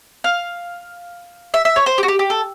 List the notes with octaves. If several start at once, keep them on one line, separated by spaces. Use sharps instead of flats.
F5
E5
E5
C#5
C5
G4
F#4
G4
G4
A4